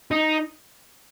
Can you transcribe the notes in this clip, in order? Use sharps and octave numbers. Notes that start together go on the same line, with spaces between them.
D#4